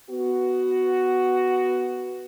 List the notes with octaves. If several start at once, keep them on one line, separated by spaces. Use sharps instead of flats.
B3 F#4